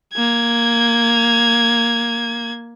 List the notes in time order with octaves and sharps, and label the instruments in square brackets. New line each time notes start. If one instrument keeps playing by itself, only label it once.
[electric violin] A#3 G#6